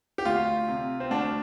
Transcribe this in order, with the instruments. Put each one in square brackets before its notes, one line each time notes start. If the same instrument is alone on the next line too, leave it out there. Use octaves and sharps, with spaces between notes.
[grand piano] G4
D2 F4
C3
C4
D2 D4